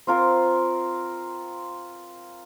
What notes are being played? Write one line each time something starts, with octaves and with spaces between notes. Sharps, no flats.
C4 F4 A#4